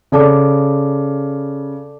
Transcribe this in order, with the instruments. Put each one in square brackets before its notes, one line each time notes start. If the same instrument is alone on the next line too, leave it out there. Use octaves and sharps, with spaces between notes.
[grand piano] C#3 [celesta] A4 D5 A5 D6